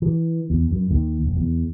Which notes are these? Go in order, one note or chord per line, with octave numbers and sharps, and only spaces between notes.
E3
E2
F#2
D#2
F1
E2